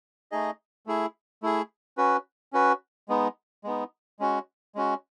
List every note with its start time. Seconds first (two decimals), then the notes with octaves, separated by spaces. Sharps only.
0.31 A3 D#4 G#4 D#5
0.86 A3 E4 G#4
1.43 A3 E4 G#4
1.97 C#4 F#4 B4
2.53 C#4 F#4 B4
3.09 G#3 B3 D#4
3.64 G#3 B3 D#4
4.20 G#3 C#4 F#4
4.75 G#3 C#4 F#4